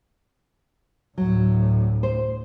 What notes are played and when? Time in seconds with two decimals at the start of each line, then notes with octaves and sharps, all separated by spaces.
1.18 D2 A2 F#3
2.03 C5